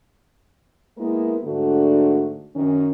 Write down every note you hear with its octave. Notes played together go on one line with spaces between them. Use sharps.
G#3 A#3 B3 E4 A#4
G#2 D3 A3 D4 F#4
F#2 D#3 C#4